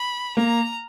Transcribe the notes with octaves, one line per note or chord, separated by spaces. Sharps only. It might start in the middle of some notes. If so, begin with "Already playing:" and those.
Already playing: B5
A#3 A#5